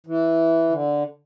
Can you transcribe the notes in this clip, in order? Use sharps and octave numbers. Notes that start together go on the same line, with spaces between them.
E3
D3